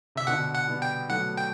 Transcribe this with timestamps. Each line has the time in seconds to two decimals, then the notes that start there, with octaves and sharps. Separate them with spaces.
0.15 C3 E5
0.27 B2 D3 F#5
0.55 F#5
0.68 G3 B3
0.82 G5
1.09 F#3 A3 F#5
1.37 G5